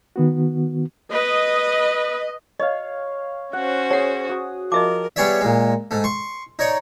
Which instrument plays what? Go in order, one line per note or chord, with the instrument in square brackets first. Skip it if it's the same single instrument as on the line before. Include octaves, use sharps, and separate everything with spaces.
[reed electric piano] D#3 B3 F#4
[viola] B4 [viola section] D#5
[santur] C#5 F5 [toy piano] D#5
[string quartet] C#4 F#4 C5 [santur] F#5
[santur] G#4 [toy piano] C#5 F#5
[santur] F#4 D#6
[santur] F3 [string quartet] A#4 [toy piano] D#5 E5 D6
[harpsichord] G3 B3 G#4 C#5 D5 E5
A#2 G#3
G#2 A3
C6 C#6
D#4 C#5 D5